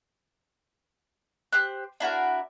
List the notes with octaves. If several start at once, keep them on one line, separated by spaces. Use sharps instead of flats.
G4 C5 F#6
D4 E4 F#4 A#4